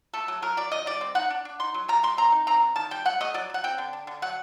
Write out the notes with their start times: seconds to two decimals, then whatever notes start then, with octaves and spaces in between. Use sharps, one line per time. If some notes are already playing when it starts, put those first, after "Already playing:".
0.14 A3 A4
0.28 F#3
0.42 F#3 A#4
0.57 F#3 D5
0.72 D#3 D#5
0.86 G3 D5
1.01 C4
1.15 D#4 F#5
1.30 D4
1.45 D4
1.60 D#4 C6
1.74 F#3
1.88 G3 A#5
2.03 G3 C6
2.17 C4 A#5
2.32 D#4
2.47 C4 A#5
2.62 D3
2.76 D#3 A5
2.91 G3 G5
3.05 F#3 F#5
3.20 A3 D#5
3.34 F#3 D5
3.50 F#3 F#5
3.64 C4 G5
3.78 D3
3.93 D4
4.07 D3
4.22 F#3 F#5